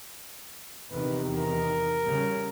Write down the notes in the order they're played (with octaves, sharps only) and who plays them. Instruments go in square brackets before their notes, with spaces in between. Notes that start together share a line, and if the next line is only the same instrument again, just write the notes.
[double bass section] E2 C3 D#3 [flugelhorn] B4
[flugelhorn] A#4
[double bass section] C#3 G3